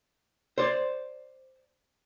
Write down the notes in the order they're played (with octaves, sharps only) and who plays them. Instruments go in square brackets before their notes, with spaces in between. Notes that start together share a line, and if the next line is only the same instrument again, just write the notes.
[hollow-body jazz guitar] C5 D5